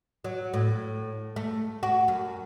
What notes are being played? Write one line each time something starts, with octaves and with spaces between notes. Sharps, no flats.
F#3
A2
A3
F#4
F#2